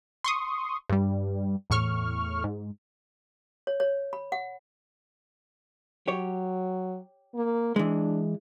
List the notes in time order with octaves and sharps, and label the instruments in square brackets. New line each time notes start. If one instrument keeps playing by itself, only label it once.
[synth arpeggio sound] C6 C#6 D#6
G2 G3
E2 A2 C#6 F6
G#2
[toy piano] C#5
C#5
B5
F#5
[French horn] F#3 [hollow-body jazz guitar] G4 C#5
[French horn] A#3
[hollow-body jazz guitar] E3 G#3 [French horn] D4